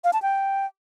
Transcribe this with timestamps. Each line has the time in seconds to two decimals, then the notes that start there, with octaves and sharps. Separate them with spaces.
0.04 F5
0.13 A5
0.22 G5